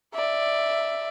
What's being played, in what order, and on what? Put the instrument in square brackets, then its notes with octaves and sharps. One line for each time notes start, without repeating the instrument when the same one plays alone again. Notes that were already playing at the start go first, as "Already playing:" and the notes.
[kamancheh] D5 E5